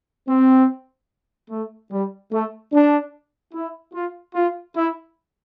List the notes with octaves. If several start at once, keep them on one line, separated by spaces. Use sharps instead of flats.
C4
A3
G3
A3
D4
E4
F4
F4
E4